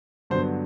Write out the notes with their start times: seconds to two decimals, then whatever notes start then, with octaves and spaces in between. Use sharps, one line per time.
0.30 G2 D3 F#3 B3 C5